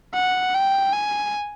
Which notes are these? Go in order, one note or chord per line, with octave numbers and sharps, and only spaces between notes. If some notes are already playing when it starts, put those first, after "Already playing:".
F#5
G5
G#5